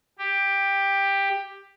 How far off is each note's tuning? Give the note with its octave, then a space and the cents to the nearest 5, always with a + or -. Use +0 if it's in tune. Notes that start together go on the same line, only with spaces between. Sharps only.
G4 +10